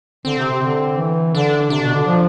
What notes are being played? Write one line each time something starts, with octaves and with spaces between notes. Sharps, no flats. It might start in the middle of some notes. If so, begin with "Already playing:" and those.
D3 C4
C3
C3
D3
E3
D3 D4
C3 D4
B2
D3
F3